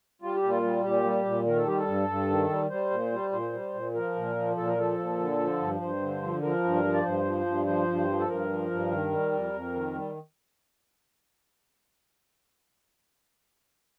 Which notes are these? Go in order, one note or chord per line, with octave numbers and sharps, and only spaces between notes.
G3 F4
G4
A#2
F4
G3
A#2 G4
G3
A#2
D#3 A#4
A4
G3 G4
A4
G2
G2
D#3
G3
G3 C5
A#2
G3
A#2 C5
G3
A#2
F3 A#4
A#2
F3
A#2 A4
A#4
F3 A4
A#2
D3
F3
G2
G2 C5
D3
F3
F3 A#4
G2
F3
D5
G2 C5
F3
G2
F3 C5
G2
F3
A4
G2 A#4
F3
G2
D#3
G3
F2
F2
D#3
G3